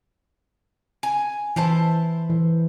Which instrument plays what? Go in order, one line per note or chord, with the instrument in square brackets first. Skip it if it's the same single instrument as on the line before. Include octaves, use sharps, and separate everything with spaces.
[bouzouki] G#5
[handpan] E3 [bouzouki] E4 C5 A5
[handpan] E3